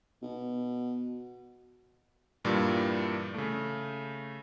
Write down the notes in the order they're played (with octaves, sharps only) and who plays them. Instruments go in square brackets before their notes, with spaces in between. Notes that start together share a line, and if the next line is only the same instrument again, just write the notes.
[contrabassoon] B2
[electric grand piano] G2 A#2 E3 G3
C#3 A3